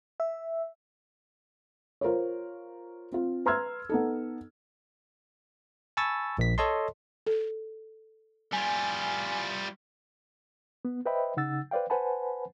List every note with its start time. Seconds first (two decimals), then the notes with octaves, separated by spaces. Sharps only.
0.20 E5
2.01 F4 A#4 C5 C#5
3.12 C4 F4
3.46 B4 A#5 C6 E6 F6 G#6
3.89 B3 D#4 A4
5.97 G#5 A5 B5 C#6 E6 A6
6.38 A#1 B6
6.58 A4 C#5 D#5 A5 C6
7.27 A4
8.53 G3 F4 G#5
10.85 B3
11.06 B4 C5 D#5 E5 G5 B5
11.37 C#3 D#4 F#5 E6 A6
11.71 B4 C5 D5 F5 G5
11.90 B4 C5 F#5 G#5 A5 B5